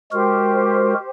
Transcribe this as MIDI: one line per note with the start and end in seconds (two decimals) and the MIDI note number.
0.12 0.94 56
0.12 0.94 66
0.12 1.09 67
0.12 0.94 70
0.12 1.09 72